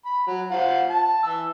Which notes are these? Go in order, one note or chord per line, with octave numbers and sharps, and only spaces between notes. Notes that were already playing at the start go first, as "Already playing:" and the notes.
B5
F#3
F4 C5 F#5
A5
E3 E6